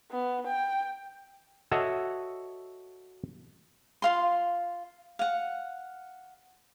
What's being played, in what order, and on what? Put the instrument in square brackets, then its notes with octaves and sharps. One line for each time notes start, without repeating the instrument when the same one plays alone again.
[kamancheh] B3
G5
[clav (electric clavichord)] F#4 A4 C#5 D#5 E5 F#5
[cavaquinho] F4 F5 C6
F5 F#5